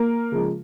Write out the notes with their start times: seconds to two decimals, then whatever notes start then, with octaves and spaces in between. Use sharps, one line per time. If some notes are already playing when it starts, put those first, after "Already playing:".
Already playing: A#3 A#4
0.32 C#3 F3 G#3